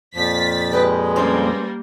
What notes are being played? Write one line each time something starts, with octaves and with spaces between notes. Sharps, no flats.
F2 A#2 F3 A6 B6
G#3 G4 B4 D#5
G3 A#3 C4 C#4 C5